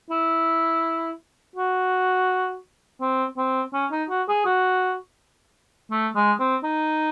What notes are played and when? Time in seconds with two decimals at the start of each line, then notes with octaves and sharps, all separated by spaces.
0.11 E4
1.56 F#4
3.01 C4
3.37 C4
3.74 C#4
3.92 D#4
4.10 F#4
4.29 G#4
4.46 F#4
5.91 A3
6.16 G#3
6.40 C4
6.64 D#4